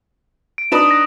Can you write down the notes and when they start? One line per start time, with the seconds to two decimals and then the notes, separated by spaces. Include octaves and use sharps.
0.58 D7
0.72 D4 D#4 B4 D#6 E7
0.91 A#6